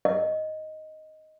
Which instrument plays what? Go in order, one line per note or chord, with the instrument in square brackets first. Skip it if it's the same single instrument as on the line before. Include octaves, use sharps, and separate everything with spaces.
[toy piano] D#5